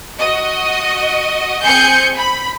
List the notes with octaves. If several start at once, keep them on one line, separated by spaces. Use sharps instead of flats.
F#4 D#5
C4 G#4 G#5 G6 C#7
B5